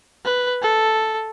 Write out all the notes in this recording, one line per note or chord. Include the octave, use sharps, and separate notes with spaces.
B4
A4